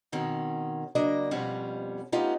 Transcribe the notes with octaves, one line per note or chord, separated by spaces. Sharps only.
B2 D#3 C4 C#4
C#3 F#3 A#3 D4 D#5
F2 B2 F3 G3 B3 C#4
A3 B3 C#4 D#4 F4 G4